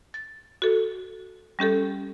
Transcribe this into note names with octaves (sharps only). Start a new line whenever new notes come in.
A6
F#4 A4
G3 C#4 G4 A4